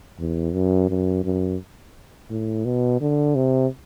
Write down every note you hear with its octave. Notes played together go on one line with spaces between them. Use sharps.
E2
F#2
F#2
F#2
A2
B2
D3
C3